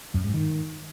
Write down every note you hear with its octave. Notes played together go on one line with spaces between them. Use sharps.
F#2
G#2
D#3